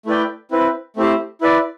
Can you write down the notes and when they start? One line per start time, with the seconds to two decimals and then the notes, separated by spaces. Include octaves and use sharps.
0.06 A3 E4 B4 D5 G5
0.51 C4 E4 B4
0.96 A3 C4 E4 G4 C5
1.41 E4 B4 D5